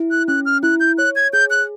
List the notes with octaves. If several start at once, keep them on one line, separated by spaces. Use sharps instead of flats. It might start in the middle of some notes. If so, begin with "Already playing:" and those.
Already playing: E4
F#6
C#4 F#6
F6
E4 F#6
G6
C#5 F#6
G#6
G#4 G6
F#6